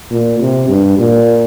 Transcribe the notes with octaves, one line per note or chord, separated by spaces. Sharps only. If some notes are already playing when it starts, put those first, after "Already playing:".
A#2
C3
G2
A#2